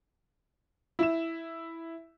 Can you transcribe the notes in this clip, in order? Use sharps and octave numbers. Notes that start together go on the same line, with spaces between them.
E4 E7